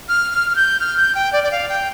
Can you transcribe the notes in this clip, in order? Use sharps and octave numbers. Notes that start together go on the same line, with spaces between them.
F6
F6
F6
G6
F6
G6
G5
D5
D5
F5
G5